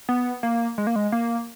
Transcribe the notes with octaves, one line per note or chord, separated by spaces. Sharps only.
B3
A#3
G#3
A#3
G#3
A#3